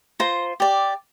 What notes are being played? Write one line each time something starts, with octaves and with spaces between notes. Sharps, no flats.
F4 C5 A#5
G4 D5